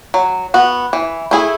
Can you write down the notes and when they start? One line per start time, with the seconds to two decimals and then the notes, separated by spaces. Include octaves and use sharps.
0.14 F#3
0.54 B3 F#4
0.93 E3
1.31 A3 E4 G#4